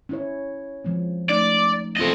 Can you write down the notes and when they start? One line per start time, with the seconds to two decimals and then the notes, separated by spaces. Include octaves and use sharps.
0.09 C#4 E4 C#5
0.84 F3 G#3 C4
1.29 A3 C#4 D#4 D5
1.97 B3 C4 F4 A4 D#5